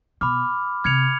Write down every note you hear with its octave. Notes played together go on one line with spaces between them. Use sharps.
B2 B5 D6 F6
C3 F6 G#6 C#7 F7